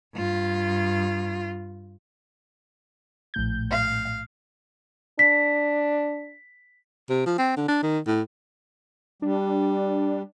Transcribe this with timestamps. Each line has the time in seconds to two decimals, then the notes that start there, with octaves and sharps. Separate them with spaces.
0.15 G2 F4
3.34 A#1 A2 G6
3.71 F5
5.19 D4 B6
7.10 C3
7.26 F3
7.38 C4
7.56 D3
7.68 D4
7.83 D#3
8.07 A2
9.22 G3 D4